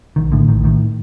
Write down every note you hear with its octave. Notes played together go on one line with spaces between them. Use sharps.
A#1 D#3
A2 D3
A#1 D#3
A2 D#3